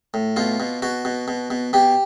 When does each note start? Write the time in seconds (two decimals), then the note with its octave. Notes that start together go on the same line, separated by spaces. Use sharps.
0.14 A2
0.36 B2 F4
0.60 B2
0.82 B2 F#4
1.05 B2
1.28 B2
1.50 B2
1.73 B2 G4